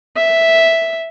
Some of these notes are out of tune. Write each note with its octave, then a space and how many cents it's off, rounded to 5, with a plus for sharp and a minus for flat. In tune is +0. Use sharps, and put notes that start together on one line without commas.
E5 -5